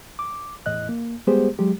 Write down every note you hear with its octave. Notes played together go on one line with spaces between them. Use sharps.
D6
E2 A2 D#5 F#6
A#3
G3 G#3 B3 G4 G#4 C5
F#3 G#3 G4